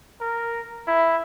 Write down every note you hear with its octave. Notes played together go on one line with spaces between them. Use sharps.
A#4
E4